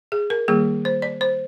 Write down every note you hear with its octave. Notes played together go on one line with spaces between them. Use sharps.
G#4
A#4
D#3 G3 A#3 G#4
C5
D5
C5